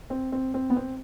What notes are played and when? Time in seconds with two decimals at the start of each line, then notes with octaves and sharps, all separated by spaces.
0.10 C4
0.32 C4
0.54 C4
0.70 B3
0.76 C4